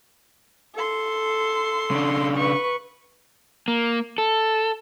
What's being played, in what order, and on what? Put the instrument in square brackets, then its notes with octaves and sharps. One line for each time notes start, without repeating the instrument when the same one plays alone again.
[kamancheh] A4 C6
[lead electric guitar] C#3 D4
[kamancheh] B4 C#6
[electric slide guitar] A#3
A4